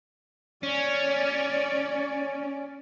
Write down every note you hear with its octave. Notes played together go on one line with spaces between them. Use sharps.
C#4 D5